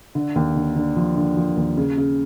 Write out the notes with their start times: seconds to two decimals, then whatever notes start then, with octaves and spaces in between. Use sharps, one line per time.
0.15 D3
0.36 D#2
0.56 D3
0.76 D3
0.96 F3
1.16 D3
1.37 F3
1.57 D#2
1.77 C#3
1.97 C#3